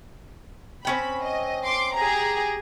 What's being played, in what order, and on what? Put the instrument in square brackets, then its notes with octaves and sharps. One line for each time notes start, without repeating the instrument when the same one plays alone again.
[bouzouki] C4 C#4 G5 [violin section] B5
[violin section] D#5
C6 D6
G4 G#4 A#5